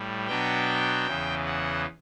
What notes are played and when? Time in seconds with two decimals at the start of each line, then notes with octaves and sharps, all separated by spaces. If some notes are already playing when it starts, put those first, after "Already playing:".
Already playing: A2 G3
0.27 B2 F#3 B3 D4 G5
1.07 E2 C#3 E3
1.46 F#5